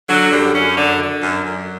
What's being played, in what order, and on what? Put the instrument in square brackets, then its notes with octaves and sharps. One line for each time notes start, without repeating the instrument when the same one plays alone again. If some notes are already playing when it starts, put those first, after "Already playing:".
[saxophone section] D3 F#3
F#2 G3
F#2 C#4
D3
D3
F#2
F#2